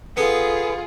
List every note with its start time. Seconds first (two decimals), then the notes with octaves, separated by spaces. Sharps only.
0.17 B3 F4 G#4 A4